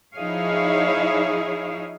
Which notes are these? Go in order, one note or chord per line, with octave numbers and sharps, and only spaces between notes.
F3 D#4 E4 G#4 C#5 F5